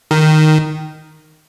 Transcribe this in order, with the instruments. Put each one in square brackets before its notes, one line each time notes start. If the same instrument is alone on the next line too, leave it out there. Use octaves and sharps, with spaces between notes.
[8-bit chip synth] D#3